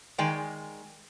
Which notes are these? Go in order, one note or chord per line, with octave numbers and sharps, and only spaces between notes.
D#3 G#3 D5 G5 G#5